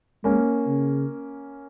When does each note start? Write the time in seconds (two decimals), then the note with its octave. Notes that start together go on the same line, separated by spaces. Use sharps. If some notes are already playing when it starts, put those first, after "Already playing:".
0.24 G#3 A#3 C#4
0.67 C#3